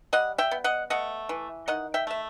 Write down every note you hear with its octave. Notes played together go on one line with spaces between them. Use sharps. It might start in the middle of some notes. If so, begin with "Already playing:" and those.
G3 D#5 F#5
E5 G5
B3
D#5 F#5
A3 D#5 F#5
E3
D#3 D#5 F#5
E5 G5
A3 E5